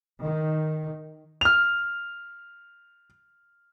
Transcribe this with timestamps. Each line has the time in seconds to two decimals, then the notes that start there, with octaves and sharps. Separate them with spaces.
0.22 D#3
1.41 F6 F7